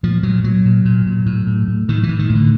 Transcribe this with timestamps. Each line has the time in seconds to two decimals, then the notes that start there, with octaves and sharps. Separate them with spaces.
0.03 A#2 F3
0.23 A#2 F#3
0.44 A#2 F#3
0.65 A#2
0.85 A#2
1.06 A#2
1.26 A2
1.47 A2
1.68 A2
1.88 A2 D#3
2.03 E3
2.09 A2
2.19 D#3
2.29 A2
2.35 D3